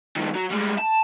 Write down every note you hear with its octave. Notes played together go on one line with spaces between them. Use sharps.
G2 D#3
F#3
G3 G#3
A5